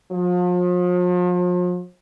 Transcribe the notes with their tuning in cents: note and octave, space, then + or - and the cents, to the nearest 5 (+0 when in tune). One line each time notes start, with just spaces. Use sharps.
F3 +40